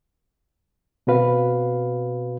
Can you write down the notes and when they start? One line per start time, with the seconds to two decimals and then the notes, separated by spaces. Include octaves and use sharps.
1.07 B2 C4 F#4 B4 F5